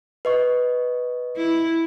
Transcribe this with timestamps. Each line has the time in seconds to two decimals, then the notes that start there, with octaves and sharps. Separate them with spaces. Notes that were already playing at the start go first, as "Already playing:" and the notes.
0.25 B4 D#5 C#6
1.37 E4